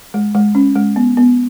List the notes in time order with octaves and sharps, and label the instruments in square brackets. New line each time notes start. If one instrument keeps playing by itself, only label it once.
[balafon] G#3
G#3
C#4
G#3
B3
B3